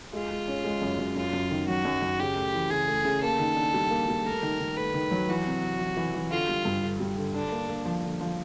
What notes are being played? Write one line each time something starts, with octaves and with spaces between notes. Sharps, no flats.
G#3 F4
G#3
C#4
G#3
F#2
F#2
F#2 F4
F#2
D#3
F#3 F#4
F#2
F#2
C#3 G4
A3
E3
C#3 G#4
A3
C#3
A#3 A4
D#3
D4
G3
A#3
G3
A3 A#4
D#3
D#3
A3 B4
D#3
F#3
E3 F#4
C3
C3
E3
E3
E3
D3 F4
G3
G2
D3
G3
D3
D3 D4
A#3
A#3
F3
D3
F3